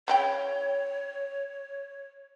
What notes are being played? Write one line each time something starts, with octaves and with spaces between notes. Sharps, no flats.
C#3 E4 C#5 G5